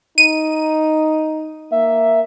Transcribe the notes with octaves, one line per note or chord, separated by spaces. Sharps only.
D#4 D#7
A#3 E5